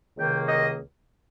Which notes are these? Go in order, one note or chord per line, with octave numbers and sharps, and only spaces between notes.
C#2 C3 D#3 A#3 G5
D#5